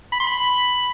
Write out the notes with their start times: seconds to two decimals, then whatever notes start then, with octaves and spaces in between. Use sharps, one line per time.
0.12 B5
0.20 C6
0.27 B5